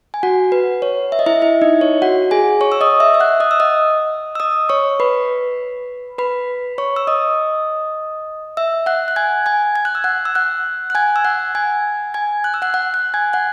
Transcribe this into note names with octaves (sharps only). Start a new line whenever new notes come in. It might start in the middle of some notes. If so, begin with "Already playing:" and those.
G#5
F#4 F#5
B4
C#5
E5
D#5
E4 E5
E4 E5
D#4 D#5
C#5
F#4 F#5
G#4 G#5
C#5 C#6
E6
D#5 D#6
E5 E6
E6
F#5 F#6
D#5 D#6
E6
D#5 D#6
E6
D#5 D#6
C#5 C#6
B4 B5
B4 B5
C#5 C#6
E6
D#5 D#6
E5 E6
F#5 F#6
F#6
G#5 G#6
G#5 G#6
G#6
F#6
E6
F#5 F#6
E6
F#5 F#6
F#6
G#5 G#6
E6
F#5 F#6
G#5 G#6
G#5 G#6
F#6
E6
F#5 F#6
F#5 F#6
F#5 F#6
G#5 G#6
F#5 F#6